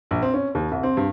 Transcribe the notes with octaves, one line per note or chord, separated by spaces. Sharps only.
A#1
C4
C#4
D#2
C2
C4
G2